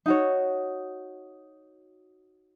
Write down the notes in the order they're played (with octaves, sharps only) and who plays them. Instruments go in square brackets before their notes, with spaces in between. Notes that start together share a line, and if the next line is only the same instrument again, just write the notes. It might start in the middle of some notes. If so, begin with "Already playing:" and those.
[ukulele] D#4 F#4 C#5